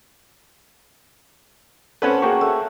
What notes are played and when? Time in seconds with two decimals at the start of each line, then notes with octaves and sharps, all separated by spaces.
2.02 C4 C#4 A4 B4 C#5 F#5 A5
2.22 A#3 F#4 G#4 G5 C#6
2.41 A3